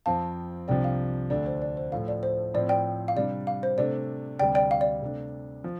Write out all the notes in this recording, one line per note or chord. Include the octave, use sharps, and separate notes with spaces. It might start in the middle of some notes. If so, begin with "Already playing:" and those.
F2 F3 C4 F5 A5
C2 C3 F3 D4 D5 G5
F5
D2 D3 A3 D4 D5
C5
D5
C5
A2 F3 A3 F5
D5
C5
A2 F3 C4 D5
D5 G5
F5
C3 G3 D4 D5
F5
C5
C3 A3 D4 D5
D2 C3 G3 D5 G5
D5 G5
F5
D5
C3 A3 D4
F3